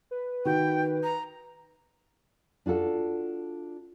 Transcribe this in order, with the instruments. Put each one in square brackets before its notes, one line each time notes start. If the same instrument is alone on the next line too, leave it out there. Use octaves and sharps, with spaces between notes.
[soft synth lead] B4
[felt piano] D#3 F#4 [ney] G5
[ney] A#5
[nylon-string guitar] D4 F4 F#4 A4